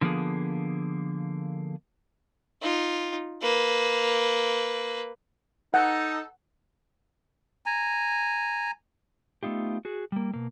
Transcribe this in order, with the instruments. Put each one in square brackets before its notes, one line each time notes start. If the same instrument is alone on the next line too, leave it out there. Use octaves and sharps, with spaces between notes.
[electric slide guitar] D3 F3 A#3 B3 G#4
[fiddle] D#4 F4
A#3 B4
[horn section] D#4 A4 [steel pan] F#5
[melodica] G#5 A#5
[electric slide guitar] A3 B3 D#4 F4 G4
F#4 G#4
G3 A#3
B2 A#3